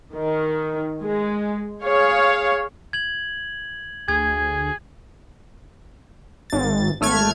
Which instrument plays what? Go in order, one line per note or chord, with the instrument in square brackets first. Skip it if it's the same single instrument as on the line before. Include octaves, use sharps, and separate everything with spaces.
[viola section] D#3
G#3
G#4 C#5 F5
[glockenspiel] G#6 F#7
[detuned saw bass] D2 [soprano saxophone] G#4 [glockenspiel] G#6
[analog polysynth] G#1 A6
G#1 A3 F6 G#6